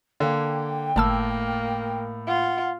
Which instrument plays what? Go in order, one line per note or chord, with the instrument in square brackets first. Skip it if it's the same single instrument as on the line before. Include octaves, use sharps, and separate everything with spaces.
[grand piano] D3 A#3 [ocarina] G5
[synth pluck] G1 A5 E6 [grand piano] A2 [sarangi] A#3
[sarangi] F4 [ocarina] F#5